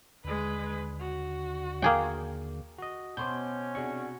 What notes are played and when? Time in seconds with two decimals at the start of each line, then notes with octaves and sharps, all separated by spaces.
0.24 D#2 D3 G#3 B4
1.01 F#4
1.82 A#3 G#4 G5
2.78 F#4 D#5
3.17 B2 C#4 C5 C#5 B5 C6 D6 G6
3.75 C3 D4 F#4 G#4 C#6